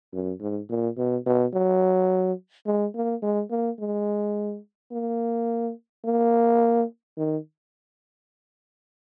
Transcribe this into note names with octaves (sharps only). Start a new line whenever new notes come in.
F#2
G#2
A#2
B2
B2
F#3
G#3
A#3
G#3
A#3
G#3
A#3
A#3
D#3